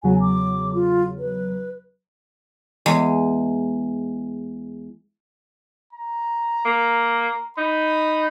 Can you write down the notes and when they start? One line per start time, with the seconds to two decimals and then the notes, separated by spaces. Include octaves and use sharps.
0.03 E2 C#3 F#3 G#5
0.21 D6
0.74 F4
1.18 B4
2.86 E2 G#3
5.93 A#5
6.65 A#3
7.57 D#4 B5